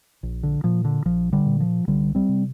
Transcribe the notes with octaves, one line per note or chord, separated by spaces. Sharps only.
A#1
D3
A#2 F3
D3
A#1 F3
D3 G3
A#2
F3
C2 D3 G3
G3 C4
C3